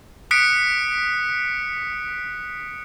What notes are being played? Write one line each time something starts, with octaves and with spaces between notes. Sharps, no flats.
D#6 F#6 B6 C#7 D7